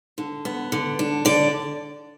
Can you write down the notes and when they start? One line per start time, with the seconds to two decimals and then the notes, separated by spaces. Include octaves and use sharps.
0.18 D3
0.45 B3
0.72 D3
0.99 D4
1.25 D3 D5